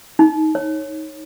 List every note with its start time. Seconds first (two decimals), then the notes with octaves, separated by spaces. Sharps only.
0.19 D#4
0.55 C#5